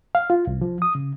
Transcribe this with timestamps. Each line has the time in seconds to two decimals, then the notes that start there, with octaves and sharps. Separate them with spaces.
0.15 F5
0.30 F4
0.47 C2
0.61 F3
0.82 D#6
0.95 C#3